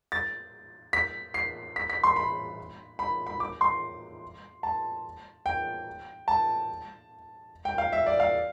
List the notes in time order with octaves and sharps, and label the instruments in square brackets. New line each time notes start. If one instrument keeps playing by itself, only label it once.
[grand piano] A6
B6
C7
B6
B6
C6
B5
B5
B5
D6
C6
A5
G5
A5
G5
F5
E5
D5
F5